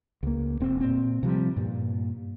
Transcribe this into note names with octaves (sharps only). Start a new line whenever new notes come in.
C#2 A#3
E1 C4
A#2 C4
C3 F3 G3
G2 A#2